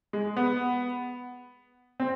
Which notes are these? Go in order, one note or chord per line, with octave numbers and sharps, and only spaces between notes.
G#3
B3
C4